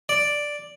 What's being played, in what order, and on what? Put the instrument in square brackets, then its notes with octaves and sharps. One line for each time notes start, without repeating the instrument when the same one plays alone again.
[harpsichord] D5